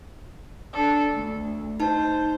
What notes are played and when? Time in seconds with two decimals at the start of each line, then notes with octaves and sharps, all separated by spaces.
0.74 D4 A4
1.12 D2
1.80 D#4 C5 A5